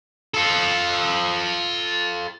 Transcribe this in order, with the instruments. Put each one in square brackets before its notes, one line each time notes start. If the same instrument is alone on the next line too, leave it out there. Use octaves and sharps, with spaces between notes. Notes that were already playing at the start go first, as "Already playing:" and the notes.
[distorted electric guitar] F4 A4